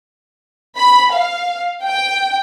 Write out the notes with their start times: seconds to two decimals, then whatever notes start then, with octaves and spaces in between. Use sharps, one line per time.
0.77 B5
1.14 F5
1.84 G5